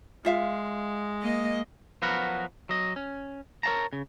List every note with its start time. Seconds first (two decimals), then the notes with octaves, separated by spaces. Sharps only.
0.25 G#3 F4 E5 F5
1.22 A#3 D#5
2.02 F3 F#3 B3 F#4 A#4 B4
2.69 F#3 D#5
2.96 C#4
3.63 A#4 C#5 F5 A5 A#5
3.93 C#3